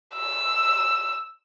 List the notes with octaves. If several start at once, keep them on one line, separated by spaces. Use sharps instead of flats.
E6